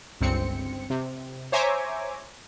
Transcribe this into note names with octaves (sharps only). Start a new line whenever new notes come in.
G1 C#2 C4 C#7
C3
C5 C#5 E5 G#5 A#5 D6